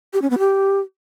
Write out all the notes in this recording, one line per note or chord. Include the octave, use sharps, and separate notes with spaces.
G4
C#4
B3
G4